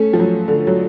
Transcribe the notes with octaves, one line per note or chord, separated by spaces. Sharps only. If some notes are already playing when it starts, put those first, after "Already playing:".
Already playing: A3 C#4
F3
F#3
D3
F#3